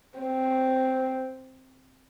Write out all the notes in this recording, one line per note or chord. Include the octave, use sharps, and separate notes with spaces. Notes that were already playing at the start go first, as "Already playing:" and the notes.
C4